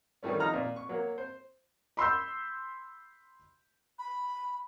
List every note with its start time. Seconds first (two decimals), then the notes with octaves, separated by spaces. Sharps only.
0.23 D#3 E3 G3 A3 C#4
0.40 F3 D#4 A#5 F6
0.53 A#2
0.76 C#6
0.89 F#3 A#3
1.18 C5
1.97 B5 C6 E6 G6
3.99 B5